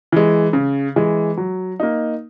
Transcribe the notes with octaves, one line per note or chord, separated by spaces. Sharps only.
E3 G#3
C#3
E3 G#3
F#3
A#3 D#4